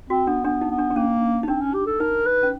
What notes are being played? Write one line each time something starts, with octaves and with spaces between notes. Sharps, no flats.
C4 F#4
B3 D4
B3 D4
D#4
B3
D4
D4
A#3 C#4
D#4
C4 D4
C#4
G4
A4
D#4 A#4
B4
C#4